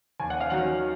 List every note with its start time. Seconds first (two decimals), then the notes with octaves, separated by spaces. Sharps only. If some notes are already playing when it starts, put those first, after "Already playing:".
0.20 D#2 G#5
0.30 F#5
0.40 F5
0.50 D#3 F#3 F#5